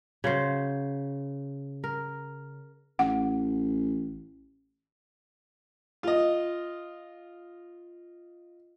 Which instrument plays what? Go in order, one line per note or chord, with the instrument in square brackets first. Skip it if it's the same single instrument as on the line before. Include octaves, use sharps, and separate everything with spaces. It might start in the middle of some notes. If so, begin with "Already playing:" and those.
[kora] C#3 F#3 C5
A#4
[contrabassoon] A1 [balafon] F#5
[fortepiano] F4 D#5